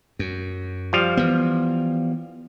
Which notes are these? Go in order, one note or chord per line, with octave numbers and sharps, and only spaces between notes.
F#2
F3 G3 F5
E3 B3